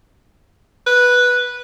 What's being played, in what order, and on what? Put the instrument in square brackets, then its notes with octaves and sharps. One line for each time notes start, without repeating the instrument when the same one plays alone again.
[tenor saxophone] B4